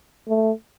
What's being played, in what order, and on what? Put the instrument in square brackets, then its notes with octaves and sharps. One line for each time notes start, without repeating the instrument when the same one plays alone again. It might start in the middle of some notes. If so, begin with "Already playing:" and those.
[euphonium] A3